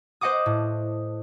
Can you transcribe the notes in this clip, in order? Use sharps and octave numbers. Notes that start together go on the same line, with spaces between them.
C5 D#5 F#5 D6 D#6
A2